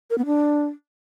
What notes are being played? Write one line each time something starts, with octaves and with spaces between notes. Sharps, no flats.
A#4
B3
D4